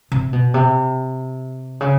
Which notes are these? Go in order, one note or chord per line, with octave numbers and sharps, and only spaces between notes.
C3
B2
C3
C#3